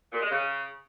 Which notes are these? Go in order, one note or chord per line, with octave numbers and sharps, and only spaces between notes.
A#2
G#3
C#3